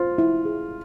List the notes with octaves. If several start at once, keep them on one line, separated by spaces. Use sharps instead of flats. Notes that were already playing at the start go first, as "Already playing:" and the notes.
Already playing: F4 C5
E4
G#4